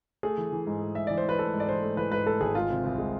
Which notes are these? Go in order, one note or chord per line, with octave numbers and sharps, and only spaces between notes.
A3 G#4
E3
E3
G#2
A3
G#2 E5
E3 D5
C5
E3 B4
A3 A4
G#2
D5
E3 C5
A3
E3 B4
G#2 B4
A3 A4
G#1 G#4
G#3 F4
C3
C2
G#3